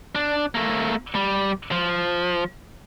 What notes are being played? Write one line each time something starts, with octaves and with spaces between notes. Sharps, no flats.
D4
A3 A#3
G3
F3